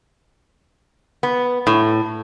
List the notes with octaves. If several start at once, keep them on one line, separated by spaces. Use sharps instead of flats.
B3
A2